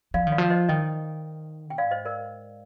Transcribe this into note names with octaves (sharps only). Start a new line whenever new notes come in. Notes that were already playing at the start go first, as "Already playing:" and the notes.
F3 D5 F5
D#3
D5 F5
F3
C5 D#5
D#3 D#5 G5
G5
G#2 D5 F5
C5 D#5
A#4 D5